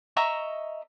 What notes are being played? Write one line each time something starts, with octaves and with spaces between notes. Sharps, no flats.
D#5 E5 A#5 C#6